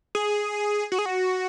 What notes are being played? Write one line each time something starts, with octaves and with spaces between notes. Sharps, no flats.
G#4
F#4
G#4
F#4